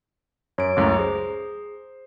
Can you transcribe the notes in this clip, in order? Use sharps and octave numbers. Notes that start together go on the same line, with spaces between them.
F#2 C#5 D7
C#2 F#2 A2 A#5 D6
G#4 C5